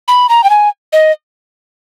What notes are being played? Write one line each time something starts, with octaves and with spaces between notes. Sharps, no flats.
B5
A#5
G5
G#5
D#5